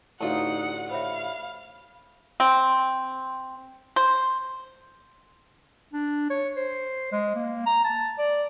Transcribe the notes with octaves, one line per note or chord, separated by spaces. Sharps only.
A1 D2 D#4 F4 F#5
C5 C#5 E5 F5 B5
C4
C5
D4
C#5
C5
G#3
A#3
A#5
A5
D5